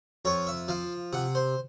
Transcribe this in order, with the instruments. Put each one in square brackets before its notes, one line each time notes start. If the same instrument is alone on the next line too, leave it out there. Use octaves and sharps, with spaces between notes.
[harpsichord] F2 C#5
E5
F3 F5
C3 F#5
C5